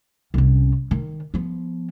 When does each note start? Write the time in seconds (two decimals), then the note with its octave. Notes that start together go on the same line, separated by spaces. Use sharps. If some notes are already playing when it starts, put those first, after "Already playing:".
0.34 C2 C#4
0.91 D#3
1.34 F3 B3